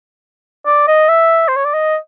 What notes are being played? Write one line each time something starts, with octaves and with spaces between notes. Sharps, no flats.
D5
D#5
E5
C5
C#5
D5
D#5